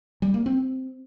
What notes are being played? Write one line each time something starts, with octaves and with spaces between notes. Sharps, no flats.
G3
A#3
C4